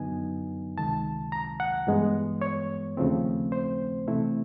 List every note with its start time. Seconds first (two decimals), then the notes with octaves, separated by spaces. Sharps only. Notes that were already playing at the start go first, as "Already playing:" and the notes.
Already playing: F#2 D3 F#3 B3 D#4 G#5
0.77 C#2 C3 D#3 G#3 A5
1.32 A#5
1.60 F#5
1.87 G2 E3 G#3 B3
2.42 C#5
2.97 D#2 C#3 F3 A3 C4
3.52 C5
4.07 C3 E3 A3 C4 E4